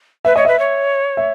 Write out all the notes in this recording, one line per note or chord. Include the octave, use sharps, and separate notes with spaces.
B4 E5
C#5 D#5
B4 E5
C#5
E5